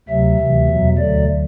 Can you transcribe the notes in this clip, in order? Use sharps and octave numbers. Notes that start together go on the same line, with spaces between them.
D2 C3 F#3 E5
D2 C3 E3
E2 B2 F#3
D2 D3 F#3 D5